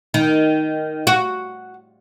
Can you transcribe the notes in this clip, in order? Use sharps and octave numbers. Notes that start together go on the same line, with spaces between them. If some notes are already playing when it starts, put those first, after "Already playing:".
D#3
F#4